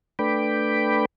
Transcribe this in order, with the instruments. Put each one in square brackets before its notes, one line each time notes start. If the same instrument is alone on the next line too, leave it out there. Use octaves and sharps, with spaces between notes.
[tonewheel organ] A3 D4 B4 G5 B5 D6